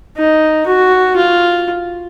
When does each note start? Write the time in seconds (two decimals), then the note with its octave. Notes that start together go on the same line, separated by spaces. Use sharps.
0.16 D#4
0.67 F#4
1.17 F4